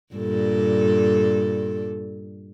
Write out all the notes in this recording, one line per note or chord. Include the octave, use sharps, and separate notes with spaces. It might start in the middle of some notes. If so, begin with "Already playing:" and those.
G2 A#2 A4